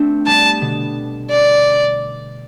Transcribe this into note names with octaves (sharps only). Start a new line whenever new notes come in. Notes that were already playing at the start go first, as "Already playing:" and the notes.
Already playing: A3 C4 D4
G3 B3 A5
B2 D3
D5